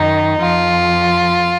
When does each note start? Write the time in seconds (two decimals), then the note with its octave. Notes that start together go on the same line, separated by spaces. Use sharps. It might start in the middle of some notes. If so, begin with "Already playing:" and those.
Already playing: F#2 D#3 D#4
0.40 F2 F3 F4